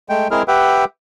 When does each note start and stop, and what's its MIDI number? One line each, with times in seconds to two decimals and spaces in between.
0.09 0.28 56
0.09 0.28 57
0.09 0.28 79
0.31 0.43 56
0.31 0.43 60
0.31 0.43 64
0.31 0.43 68
0.31 0.43 70
0.31 0.43 89
0.48 0.85 67
0.48 0.85 71
0.48 0.85 76
0.48 0.85 78
0.48 0.85 79